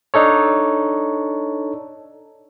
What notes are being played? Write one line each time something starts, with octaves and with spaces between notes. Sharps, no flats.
D4 D#4 A4 C#5